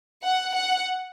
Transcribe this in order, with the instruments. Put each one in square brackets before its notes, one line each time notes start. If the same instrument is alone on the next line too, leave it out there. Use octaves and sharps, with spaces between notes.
[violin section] F#5
F#5